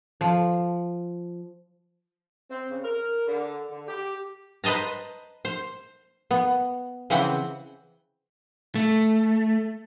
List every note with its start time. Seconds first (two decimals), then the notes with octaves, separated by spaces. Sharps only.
0.21 F3
2.50 C4
2.71 C#3
2.84 A#4
3.27 D3
3.71 D3
3.88 G4
4.64 B4 C5 D#5 A5 A#5
5.45 C5
6.31 B3
7.10 C#3 E3 C4 F#5 G5
8.75 A3